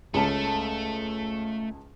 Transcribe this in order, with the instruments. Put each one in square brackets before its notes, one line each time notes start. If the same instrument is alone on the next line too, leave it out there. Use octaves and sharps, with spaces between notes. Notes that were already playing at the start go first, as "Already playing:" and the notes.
[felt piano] C#2 C#4 A5 [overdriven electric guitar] A3